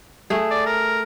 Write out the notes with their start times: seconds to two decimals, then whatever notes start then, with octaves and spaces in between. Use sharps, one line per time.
0.30 A3 G#4
0.50 D5
0.66 A#4